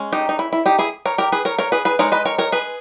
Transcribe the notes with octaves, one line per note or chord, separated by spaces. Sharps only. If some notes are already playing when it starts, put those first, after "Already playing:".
Already playing: G#3 C#4
D#4 G4
D#4
E4
E4
D#4 G4
E4 G#4
A#4 C#5
G4 A#4
G#4 B4
A#4 C#5
A#4 C#5
G#4 B4
G#4 B4
G#3 D#4 A#4 C#5
B4 D#5
A#4 C#5
A#4 C#5
G#4 B4